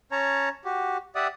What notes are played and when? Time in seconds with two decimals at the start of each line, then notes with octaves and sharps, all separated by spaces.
0.12 C#4 C#5 A5 A#5
0.65 F#4 G4
1.15 G4 D5 E5 F#5 D#6